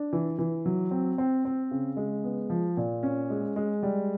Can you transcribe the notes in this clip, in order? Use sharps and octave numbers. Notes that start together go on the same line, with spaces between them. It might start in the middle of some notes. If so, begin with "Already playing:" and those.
Already playing: D4
E3
E3
F#3
C4
C4
C4
C#3
G#3
B3
F3
A#2
C#4
G#3
G#3
G3